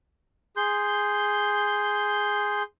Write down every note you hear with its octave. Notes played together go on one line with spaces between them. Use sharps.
G#4 C6 G6